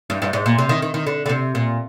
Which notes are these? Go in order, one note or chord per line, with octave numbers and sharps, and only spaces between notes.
G2
G2
G#2
A#2
C3
D#3
D#3
D#3
D3
D3
C3
A#2